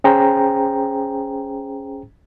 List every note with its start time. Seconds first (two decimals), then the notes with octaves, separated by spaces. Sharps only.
0.04 C#4 G#4 C5 G5 A#5